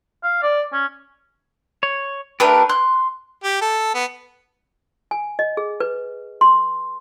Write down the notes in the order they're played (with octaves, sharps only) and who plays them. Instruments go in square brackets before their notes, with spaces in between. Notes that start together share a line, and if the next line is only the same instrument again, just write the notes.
[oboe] F5
D5
C#4
[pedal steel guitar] C#5
[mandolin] A3 D4 B4 [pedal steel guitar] G4 A#4
[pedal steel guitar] C6 [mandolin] F#6
[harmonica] G4
A4
B3
[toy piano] G#5
D#5
G#4
B4
C6